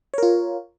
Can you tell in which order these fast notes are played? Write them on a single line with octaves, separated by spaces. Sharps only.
C#5 A#4 F4